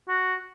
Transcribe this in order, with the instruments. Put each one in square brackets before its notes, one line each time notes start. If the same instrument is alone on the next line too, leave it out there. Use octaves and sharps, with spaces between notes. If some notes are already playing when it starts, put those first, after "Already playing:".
[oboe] F#4